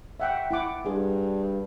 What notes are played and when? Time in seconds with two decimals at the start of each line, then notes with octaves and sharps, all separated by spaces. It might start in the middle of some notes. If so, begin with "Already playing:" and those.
0.20 E5 F#5 G5
0.51 E4 F#5 D6
0.86 G2 G#4